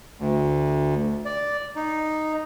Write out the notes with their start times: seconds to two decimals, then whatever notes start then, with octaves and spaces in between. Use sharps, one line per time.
0.19 D2
1.25 D5
1.76 D#4